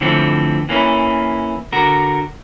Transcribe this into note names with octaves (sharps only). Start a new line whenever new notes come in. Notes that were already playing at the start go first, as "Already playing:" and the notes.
D3 E3 F3 A3 C4
E3 A#3 C#4 E4
D3 F#4 A#4